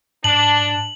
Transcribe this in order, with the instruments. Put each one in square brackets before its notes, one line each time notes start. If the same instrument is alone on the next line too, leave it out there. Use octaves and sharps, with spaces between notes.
[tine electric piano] G#2 [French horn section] D4 [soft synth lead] A5 [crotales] F#7